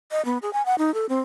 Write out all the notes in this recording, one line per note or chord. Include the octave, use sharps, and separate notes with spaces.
D#5
B3
G#4
G#5
F#5
D#4
A4
C4